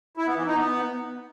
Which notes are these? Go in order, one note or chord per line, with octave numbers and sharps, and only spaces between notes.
E4
B3
E3
D#4
B3